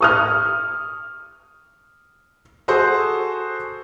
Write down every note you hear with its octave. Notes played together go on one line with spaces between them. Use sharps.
C#6 D#6 F6
F#4 G#4 A4 C5 D#6